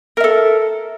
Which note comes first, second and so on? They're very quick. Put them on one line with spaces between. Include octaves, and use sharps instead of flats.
A#4 E5 A4